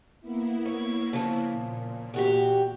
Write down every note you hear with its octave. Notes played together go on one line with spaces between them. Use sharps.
A#3 B3 E4
C#5
C#3 F3
A#2
E2 F#4 G4